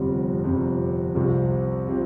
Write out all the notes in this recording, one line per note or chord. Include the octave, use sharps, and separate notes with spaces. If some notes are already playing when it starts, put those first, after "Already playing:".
Already playing: G1 F2 C3 G3
G1 F2 C3 G3
C2 C3 F3 C4
C3 F3 C4